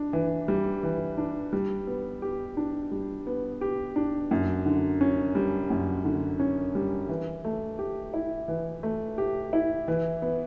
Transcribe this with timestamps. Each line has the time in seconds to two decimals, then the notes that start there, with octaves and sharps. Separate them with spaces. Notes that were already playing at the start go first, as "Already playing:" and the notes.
Already playing: D4
0.13 E3
0.48 G3
0.83 E3
1.18 D4
1.53 G3
1.87 B3
2.22 G4
2.57 D4
2.91 G3
3.27 B3
3.61 G4
3.96 D4
4.31 F#2
4.66 D3
5.01 C#4
5.35 G3
5.70 F#2
6.05 D3
6.40 C#4
6.75 G3
7.09 E3
7.45 A3
7.79 G4
8.14 E4
8.48 E3
8.83 A3
9.18 G4
9.53 E4
9.88 E3
10.22 B3